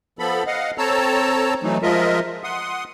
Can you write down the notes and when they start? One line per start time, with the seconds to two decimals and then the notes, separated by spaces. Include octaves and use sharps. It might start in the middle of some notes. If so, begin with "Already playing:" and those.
0.19 F3 B3 A4 B5
0.47 D#5 F5 F#5
0.78 C4 A4 C#5 A5 A#5 E6
1.63 E3 F#3 A3 D#4
1.83 F3 G#3 F4 A#4 D#5 E5
2.44 F#5 C6 D#6